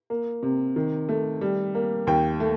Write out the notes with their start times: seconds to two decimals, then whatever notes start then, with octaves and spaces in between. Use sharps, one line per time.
0.10 A#3
0.43 C3
0.76 D#3
1.09 A3
1.41 G3
1.75 A#3
2.07 D#2 G5
2.40 A3